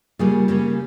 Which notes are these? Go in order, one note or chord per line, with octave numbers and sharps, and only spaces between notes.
C#3 G3 A#3 F4 G#4
C#3 G3 A#3 C#4